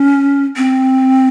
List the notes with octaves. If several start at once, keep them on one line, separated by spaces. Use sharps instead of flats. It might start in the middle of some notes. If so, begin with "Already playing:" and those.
Already playing: C#4
C4